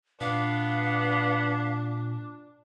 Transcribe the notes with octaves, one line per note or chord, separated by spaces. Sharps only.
A#2 B3 D4 F5